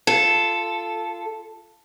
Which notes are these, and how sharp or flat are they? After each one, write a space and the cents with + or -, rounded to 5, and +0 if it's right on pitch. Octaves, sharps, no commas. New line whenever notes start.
F4 -15 A4 +0